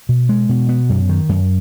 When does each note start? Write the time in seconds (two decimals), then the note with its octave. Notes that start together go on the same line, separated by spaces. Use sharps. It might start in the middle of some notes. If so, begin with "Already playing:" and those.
0.09 B2
0.29 G#3
0.49 B2
0.69 B3
0.89 F#2
1.09 D#3
1.29 F#2